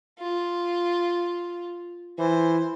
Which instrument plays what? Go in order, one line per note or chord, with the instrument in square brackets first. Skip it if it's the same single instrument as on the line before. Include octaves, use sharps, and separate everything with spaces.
[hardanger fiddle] F4
[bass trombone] E3 [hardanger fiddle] C5